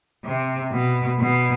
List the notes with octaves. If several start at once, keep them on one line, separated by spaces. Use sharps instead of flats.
C3
B2
B2